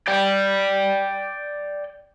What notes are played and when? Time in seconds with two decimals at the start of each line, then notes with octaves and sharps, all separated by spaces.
0.08 D5 G5